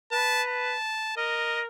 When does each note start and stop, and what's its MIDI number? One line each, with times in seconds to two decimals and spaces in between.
0.12 0.75 71
0.12 0.43 81
0.48 1.12 81
1.17 1.67 70
1.17 1.60 75